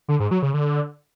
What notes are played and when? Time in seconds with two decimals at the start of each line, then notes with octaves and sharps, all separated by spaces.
0.08 D3
0.20 G#2
0.31 F#3
0.42 C#3
0.54 D3